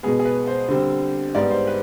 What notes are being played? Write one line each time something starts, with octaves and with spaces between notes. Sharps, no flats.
B2 G#3 B3 G#4
G#4
B4
C5
D3 G3 C4
G#2 G3 B3 D5
C5
B4